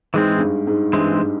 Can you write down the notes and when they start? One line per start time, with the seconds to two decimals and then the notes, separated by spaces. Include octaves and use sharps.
0.14 G#2 E3 G#3 C4
0.36 G#2
0.40 G2
0.67 G#2
0.93 G2 E3 G#3 C4
1.13 G#2